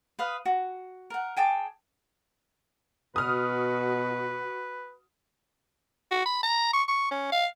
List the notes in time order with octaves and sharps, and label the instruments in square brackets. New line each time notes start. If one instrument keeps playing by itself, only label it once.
[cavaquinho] B4 F5 D#6
F#4
A#4 F#5
G#4 G5 A5 D6
[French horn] B2 [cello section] F#4 [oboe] B4 [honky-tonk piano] D#6 F6
[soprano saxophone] F#4
B5
A#5
C#6
C#6
C#4
F5